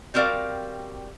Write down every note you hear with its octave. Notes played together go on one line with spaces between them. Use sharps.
G3 C4 F#4 A#4 D5 F5